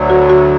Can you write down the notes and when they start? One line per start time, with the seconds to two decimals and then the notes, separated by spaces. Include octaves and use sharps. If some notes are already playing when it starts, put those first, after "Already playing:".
Already playing: D2 D3 F#3
0.10 F#4
0.29 F#4